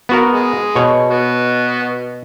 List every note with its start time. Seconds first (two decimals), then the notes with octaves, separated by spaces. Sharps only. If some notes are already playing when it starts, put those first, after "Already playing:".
0.09 B3 F#4 A#4
0.32 G#3
0.75 B2 C#5
1.09 B3 F#4